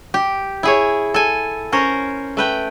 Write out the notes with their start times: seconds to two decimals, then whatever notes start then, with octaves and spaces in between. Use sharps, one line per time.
0.14 G4
0.63 E4 G#4 C#5
1.14 A4 G#5
1.72 C#4 A#4 C5 C#5
2.37 A3 B4 G5